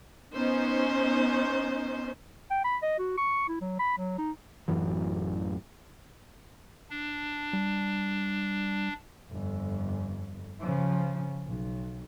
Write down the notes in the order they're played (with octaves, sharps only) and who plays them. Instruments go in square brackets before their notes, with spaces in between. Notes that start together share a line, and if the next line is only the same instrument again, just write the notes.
[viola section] B3 C#4 D#4 C5
[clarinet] G5
B5
D#5
F#4
C#6
E4
F#3
B5
F#3
D#4
[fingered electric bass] A1 F#2 E3 F#3
[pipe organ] D4
[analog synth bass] G3
[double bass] G1 F2
C#3 F3
B1